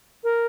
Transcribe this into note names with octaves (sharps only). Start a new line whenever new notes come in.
A#4